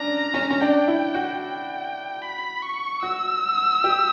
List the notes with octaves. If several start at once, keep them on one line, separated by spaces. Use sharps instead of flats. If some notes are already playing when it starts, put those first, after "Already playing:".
Already playing: C#4 D4 A#5
C#4
C#4
D4 G5
E4
F#4
G5
B5
C#6
F#4 E6
G4